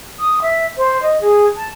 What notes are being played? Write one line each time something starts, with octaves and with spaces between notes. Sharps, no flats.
D#6
E5
C5
D#5
G#4
A5